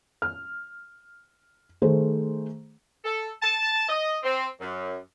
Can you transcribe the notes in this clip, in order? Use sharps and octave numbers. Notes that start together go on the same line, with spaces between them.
F6
D#3 A3 G#4 C5
A4
A5
D#5
C4
F#2